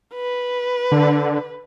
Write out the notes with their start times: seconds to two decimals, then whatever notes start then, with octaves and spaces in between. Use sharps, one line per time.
0.15 B4
0.92 D3